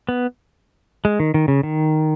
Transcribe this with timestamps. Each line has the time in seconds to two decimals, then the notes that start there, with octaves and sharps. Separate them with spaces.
0.09 B3
1.05 G#3
1.20 D#3
1.34 D#3
1.48 C#3
1.63 D#3